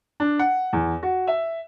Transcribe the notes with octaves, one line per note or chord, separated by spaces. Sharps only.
D4
F#5
E2
F#4
E5